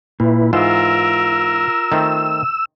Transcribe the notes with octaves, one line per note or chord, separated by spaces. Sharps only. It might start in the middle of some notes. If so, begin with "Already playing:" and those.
A#2 E4 B4
G#2 E3 F4 A#4 E6
D#3 A3 C4